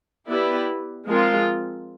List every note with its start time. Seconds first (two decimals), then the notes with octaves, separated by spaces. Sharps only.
0.28 B3 E4 G4 B4 D5
1.08 F3 G#3 C4 F4 A#4